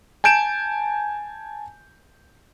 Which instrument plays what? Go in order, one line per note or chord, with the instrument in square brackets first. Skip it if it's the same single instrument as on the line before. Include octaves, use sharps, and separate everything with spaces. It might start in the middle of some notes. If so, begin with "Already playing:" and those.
[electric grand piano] G#5 A5 G6 D7 E7